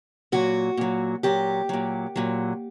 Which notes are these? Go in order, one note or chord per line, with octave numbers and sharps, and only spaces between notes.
A#2 F#3 F#4
A#2 F#3
A#2 F#3 G4
A#2 F#3
A#2 F#3